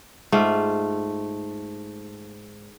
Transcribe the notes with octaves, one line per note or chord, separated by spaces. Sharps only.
G#2 A3 F4